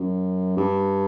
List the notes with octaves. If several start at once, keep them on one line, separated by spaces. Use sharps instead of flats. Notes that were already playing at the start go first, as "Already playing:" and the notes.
Already playing: F#2
G2